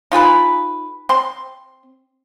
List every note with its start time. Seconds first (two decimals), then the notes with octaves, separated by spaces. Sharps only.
0.12 D#4 F4 G#4 B4
1.09 C4 C6